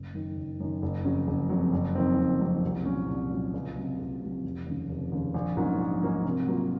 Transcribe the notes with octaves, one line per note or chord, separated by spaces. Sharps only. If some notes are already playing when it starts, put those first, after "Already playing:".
Already playing: F#1
F#2 D#3
F#1
F#2 D#3
F#1
F2 C#3 F#3
F#1
F2 C#3 F#3
F#1
F2 D#3 F#3 C4
F#1
F2 D#3 F#3 C4
C2
A#2 F#3 C#4
C2
A#2 F#3 C#4
C#2
C3 F#3
C#2
C3 F#3
F1
D#2 C#3
F1
D#2 C#3
A#1
G#2 F#3 A#3 C#4
A#1
G#2 F#3 A#3 C#4
C3
F#3 A#3 F4